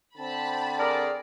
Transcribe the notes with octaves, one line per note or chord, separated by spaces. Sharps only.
D3 C4 A5 B5
G#4 A#4 D5